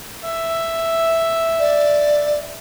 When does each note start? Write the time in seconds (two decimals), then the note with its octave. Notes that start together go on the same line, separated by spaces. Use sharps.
0.24 E5
1.59 D5